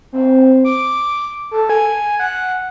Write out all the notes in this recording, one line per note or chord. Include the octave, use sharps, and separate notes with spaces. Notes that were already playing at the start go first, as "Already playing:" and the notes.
C4
D6
A4
G#5
F#5